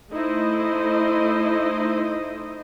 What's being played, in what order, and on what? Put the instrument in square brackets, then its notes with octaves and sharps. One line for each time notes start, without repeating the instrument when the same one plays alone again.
[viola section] A3 D#4 E4 C5 D#5